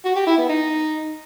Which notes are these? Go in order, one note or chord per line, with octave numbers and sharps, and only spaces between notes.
F#4
G4
E4
B3
D#4